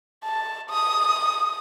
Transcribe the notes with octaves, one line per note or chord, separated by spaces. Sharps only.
A5
D#6